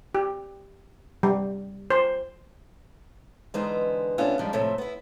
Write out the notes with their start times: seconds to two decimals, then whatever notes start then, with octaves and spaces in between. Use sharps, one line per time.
0.15 G4
1.23 G3
1.90 C5
3.54 D3 E3 G#3 B3 D#4 C5
4.18 C3 A3 B3 C#4 D4 F4
4.39 F3 G3 G#3 D4 D#4
4.53 A2 C3 F3 A3
4.78 B3 E4